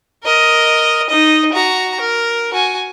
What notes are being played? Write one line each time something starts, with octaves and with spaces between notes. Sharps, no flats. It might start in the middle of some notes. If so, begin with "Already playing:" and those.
A#4 D#5
D#4 D#5
F#4 A#5
A#4
F#4 G#5